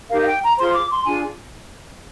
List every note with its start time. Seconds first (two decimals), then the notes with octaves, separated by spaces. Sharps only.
0.10 D#4 G4 A#4 F5
0.21 F5
0.26 G5
0.42 A#5
0.58 F4 G#4 C5 C6
0.74 D6
0.90 C6
1.05 D4 F4 G#4 G#5